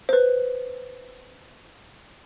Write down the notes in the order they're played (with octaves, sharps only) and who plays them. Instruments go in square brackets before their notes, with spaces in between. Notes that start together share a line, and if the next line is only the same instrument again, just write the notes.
[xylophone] B4 C5